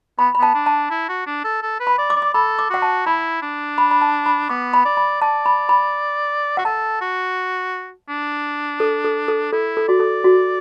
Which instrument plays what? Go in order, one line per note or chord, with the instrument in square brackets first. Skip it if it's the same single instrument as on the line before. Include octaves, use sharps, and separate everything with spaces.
[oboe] B3 [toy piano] B5
[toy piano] B5
[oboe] B3 [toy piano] A5
[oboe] D4
[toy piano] A5
[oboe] E4
F#4
D4
A4
A4
B4
[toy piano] B5
[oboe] D5
[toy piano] D6
[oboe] D5
[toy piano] D6
[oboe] A4 [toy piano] B5
[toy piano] D6
[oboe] F#4 [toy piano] F#5
[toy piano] A5
[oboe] E4 [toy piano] B5
[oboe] D4
[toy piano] B5
B5
A5
B5
[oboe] B3 [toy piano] D6
[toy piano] B5
[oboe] D5
[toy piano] B5
[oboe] D5 [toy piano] A5
[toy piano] B5
B5
[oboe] F#4 [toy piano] F#5
[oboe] A4 [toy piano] A5
[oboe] F#4
D4
[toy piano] A4
A4
A4
[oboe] E4 [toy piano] A4
[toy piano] A4
[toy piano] F#4 [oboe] D5
[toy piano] A4
F#4